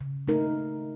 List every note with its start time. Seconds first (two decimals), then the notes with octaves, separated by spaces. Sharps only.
0.01 C#3
0.28 A3 D#4 A#4